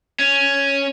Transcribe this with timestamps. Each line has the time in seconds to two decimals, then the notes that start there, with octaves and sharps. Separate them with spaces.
0.19 C#4